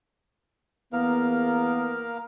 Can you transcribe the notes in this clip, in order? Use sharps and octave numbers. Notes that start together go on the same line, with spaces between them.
E2 A#3 B3 A#4 F5